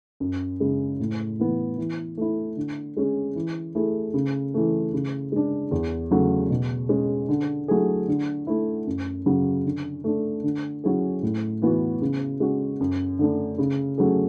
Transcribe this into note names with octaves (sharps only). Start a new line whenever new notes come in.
F#2
C#3 G#3
A2
E3 B3
E3
A3 E4
D3
G#3 C#4 G#4
E3
A3 E4 G#4
C#3
E3 A3
C#3
G#3 D4
E2
C#3 F#3 A3
B2
G#3 C#4
D3
F#3 A3 E4 G#4
D3
A3 E4
F#2
C#3 F#3
D3
A3 D4
D3
F#3 C#4 E4 G#4
A2
E3 B3 F#4
C#3
G#3 C#4 F#4
F#2
D3 A3 D4
C#3
F#3 A3 C#4 G#4